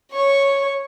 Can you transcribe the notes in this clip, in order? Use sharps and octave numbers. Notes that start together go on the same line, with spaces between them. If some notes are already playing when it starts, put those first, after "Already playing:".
C#5 C#6